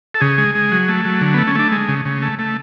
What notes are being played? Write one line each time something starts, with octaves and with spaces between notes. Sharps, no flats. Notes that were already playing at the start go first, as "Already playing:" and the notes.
A4
C#3 G#4
G#3
G#3
F#3
A3
F#3
D3
B3
A3
C#4
A3 D4
G#3
C#3
C#3
A3
A3